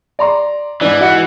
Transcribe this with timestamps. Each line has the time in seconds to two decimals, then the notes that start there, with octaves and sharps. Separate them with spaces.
0.19 D5 A#5 C6
0.81 G#2 E3 D4
1.01 F#4 D#5 F#5